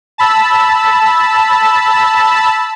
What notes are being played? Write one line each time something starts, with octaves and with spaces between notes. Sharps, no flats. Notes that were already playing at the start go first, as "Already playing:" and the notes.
A5 B5 E6